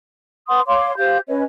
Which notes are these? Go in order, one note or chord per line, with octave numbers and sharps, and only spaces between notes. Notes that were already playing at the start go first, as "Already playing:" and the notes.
B4 F#5 C6 D#6
C#5 F5 C6 D6
G4 C5 F5 G6
C#4 B4 C#5 D#5